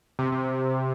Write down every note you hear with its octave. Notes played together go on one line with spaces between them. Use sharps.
C3
C3